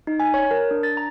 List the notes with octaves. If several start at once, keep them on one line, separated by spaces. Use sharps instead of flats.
D#4
G#5
C#5
A#4
D4
A6
A#5